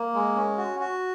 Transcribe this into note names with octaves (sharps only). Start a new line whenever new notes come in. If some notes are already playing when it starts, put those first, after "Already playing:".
Already playing: A#3
G#3
C#4
F#4
F#4